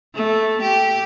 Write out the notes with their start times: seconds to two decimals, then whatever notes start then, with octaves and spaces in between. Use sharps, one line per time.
0.15 A3
0.61 G4